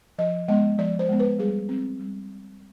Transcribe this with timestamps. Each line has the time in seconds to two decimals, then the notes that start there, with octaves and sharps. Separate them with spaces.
0.18 F3 D#5
0.48 G#3 B3 D#5
0.79 F3 D5
0.99 C5
1.09 G#3 B3
1.19 B4
1.39 G3 G#4
1.69 C4
2.00 G3